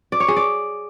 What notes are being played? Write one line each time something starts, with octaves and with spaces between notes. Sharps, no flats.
D5
C#5
G#4
D5